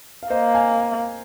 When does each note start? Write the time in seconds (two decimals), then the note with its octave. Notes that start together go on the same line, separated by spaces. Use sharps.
0.23 F5
0.30 A#3 C5 D#5
0.55 F5 G#5